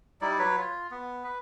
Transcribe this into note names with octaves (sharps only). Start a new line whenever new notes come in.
G3 D#4 E4 D5
F#3 B4 C#5
F4
B3
B4